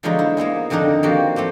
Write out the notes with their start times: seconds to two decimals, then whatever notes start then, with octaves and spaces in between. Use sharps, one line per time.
0.03 D3 F3 F#3 G#3 B3 D#4
0.19 E4
0.37 A#3 B3 E4 G#4
0.70 F2 D3 D#3 D4 D#4
1.03 F3 A#3 C4 F#4 G4
1.36 A3 C4 G4